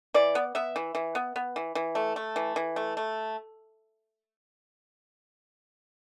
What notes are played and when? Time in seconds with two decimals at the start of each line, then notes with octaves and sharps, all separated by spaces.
0.14 E3 D5
0.35 B3
0.55 B3 E5
0.76 E3
0.95 E3
1.15 B3
1.36 B3
1.56 E3
1.75 E3
1.95 A3
2.16 A3
2.36 E3
2.56 E3
2.76 A3
2.97 A3